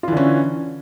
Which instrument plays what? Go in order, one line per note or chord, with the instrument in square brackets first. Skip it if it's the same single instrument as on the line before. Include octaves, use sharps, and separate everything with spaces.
[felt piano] F4
E3
D3
C#4